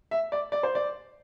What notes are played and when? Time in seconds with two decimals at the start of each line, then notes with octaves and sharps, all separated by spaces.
0.11 E5
0.32 D5
0.52 D5
0.63 C5
0.75 D5